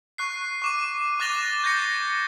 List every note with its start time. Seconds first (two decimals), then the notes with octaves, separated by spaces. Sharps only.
0.18 C#6 F#6 C7
0.62 C#6 D6 D#7
1.20 D6 F#6 A6 A#6 F7 G7
1.63 C#6 G6 G#6 A#6 C#7